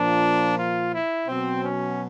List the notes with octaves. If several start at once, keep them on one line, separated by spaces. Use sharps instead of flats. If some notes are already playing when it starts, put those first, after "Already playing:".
Already playing: A#2 F3 D4
F4
E4
B2 F#3 C4
C#4